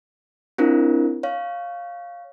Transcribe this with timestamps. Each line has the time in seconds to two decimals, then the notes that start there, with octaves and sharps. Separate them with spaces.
0.58 C4 D4 E4 F4 A#4
1.23 C#5 F5